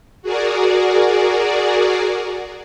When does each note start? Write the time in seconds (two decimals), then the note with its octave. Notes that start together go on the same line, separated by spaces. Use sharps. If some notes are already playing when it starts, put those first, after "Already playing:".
0.22 F#4 G#4 A#4 D5